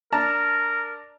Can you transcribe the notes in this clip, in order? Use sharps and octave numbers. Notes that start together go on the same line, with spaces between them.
D4 A#4 A5 A#5